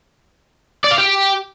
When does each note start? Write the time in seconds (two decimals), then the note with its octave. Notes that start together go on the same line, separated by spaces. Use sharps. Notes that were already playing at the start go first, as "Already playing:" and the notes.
0.84 D5
0.91 F5
0.98 G4